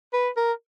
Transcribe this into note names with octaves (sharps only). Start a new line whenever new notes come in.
B4
A#4